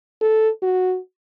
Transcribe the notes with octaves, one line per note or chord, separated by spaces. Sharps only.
A4
F#4